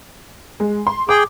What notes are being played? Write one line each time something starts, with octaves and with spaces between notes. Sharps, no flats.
G#3
C6
G#4 G5 D6